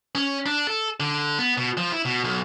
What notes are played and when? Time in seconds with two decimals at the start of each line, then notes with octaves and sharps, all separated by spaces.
0.15 C#4
0.46 D4
0.67 A4
1.00 D3
1.39 B3
1.58 B2
1.77 F3
1.92 E4
2.05 B2
2.24 B1